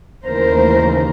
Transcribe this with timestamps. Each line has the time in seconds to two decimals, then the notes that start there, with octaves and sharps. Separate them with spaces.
0.26 D#2 C#3 E3 A3 A#4 C5